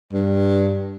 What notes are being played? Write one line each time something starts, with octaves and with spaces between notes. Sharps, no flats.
G2